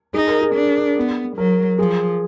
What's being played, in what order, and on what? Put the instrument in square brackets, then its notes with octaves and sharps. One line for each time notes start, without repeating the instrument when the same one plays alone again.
[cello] D#4 [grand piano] G#4
[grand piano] A#4
G#4
[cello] D4
B3
[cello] F#3 [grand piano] A#4
[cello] F3 [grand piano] G#4